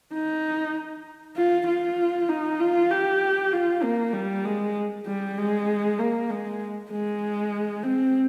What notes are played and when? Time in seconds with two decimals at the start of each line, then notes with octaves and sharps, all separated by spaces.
0.13 D#4
1.37 F4
1.67 F4
2.29 D#4
2.60 F4
2.91 G4
3.53 F4
3.83 A#3
4.13 G3
4.44 G#3
5.06 G3
5.38 G#3
5.99 A#3
6.30 G#3
6.91 G#3
7.83 C4